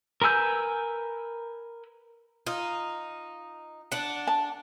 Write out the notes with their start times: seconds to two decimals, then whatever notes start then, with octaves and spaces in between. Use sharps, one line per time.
0.22 A#4 B4 G#5 E6 G6
2.46 D#4 F4
3.92 D4 F#5
4.27 A5